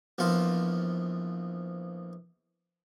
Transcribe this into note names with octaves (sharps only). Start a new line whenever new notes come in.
A#1 E2 F3 F4